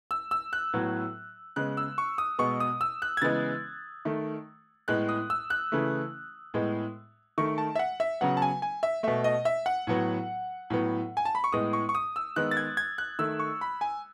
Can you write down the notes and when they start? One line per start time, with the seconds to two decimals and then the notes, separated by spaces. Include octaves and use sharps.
0.11 E6
0.31 E6
0.53 F#6
0.73 A2 F#3 B3
1.56 C#3 G#3 B3 F#6
1.77 E6
1.98 C#6
2.18 D#6
2.39 B2 G#3 B3 C#6
2.60 D#6
2.81 E6
3.02 F#6
3.17 G#6
3.22 C#3 E3 G#3 B3 A6
4.05 D#3 A3
4.88 A2 G#3 B3 F#6
5.09 D#6
5.30 E6
5.50 F#6
5.72 C#3 E3 A3
6.54 A2 G#3 B3
7.38 D#3 A3 C#6
7.58 A5
7.75 E5
7.79 F#5
8.00 E5
8.21 C#3 F#3 B3 F#5
8.37 A5
8.42 G#5
8.62 G#5
8.83 E5
9.03 B2 A3 E5
9.24 D#5
9.45 E5
9.66 F#5
9.87 A2 F#3 B3
10.70 A2 F#3 B3
11.17 G#5
11.25 A5
11.35 B5
11.44 C#6
11.52 A2 G#3 B3 D#6
11.73 C#6
11.89 C#6
11.95 D#6
12.16 E6
12.36 D#3 G#3 B3 F#6
12.51 A6
12.57 G#6
12.77 G#6
12.98 F#6
13.19 D#3 A3 E6
13.39 C#6
13.61 B5
13.81 G#5